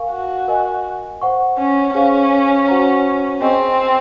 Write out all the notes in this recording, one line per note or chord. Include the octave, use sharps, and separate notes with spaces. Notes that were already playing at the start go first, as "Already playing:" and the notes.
Already playing: A#4 F5 G#5 C#6
F#4
A#4 D#5 G#5
C5 F#5 C#6
C#4
C#4 G#4 C5 F5
F#4 C5 F#5 A#5
C4 G#4 D#5 G#5 C#6